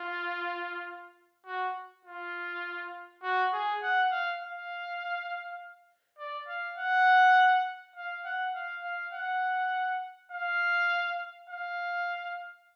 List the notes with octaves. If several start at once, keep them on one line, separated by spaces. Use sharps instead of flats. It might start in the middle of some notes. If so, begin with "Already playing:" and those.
Already playing: F4
F#4
F4
F#4
G#4
F#5
F5
F5
D5
F5
F#5
F5
F#5
F5
F5
F#5
F5
F5